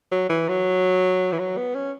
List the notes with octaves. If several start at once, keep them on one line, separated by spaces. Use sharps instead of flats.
F#3
E3
F#3
E3
F#3
B3
C#4